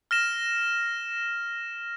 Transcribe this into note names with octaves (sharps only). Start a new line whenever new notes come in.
F6 A#6 E7